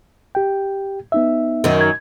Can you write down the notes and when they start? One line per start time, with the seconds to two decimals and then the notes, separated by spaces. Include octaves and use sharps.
0.35 G4 G5
1.12 B3 D#4 E5
1.64 F#2 D#3
1.81 G#6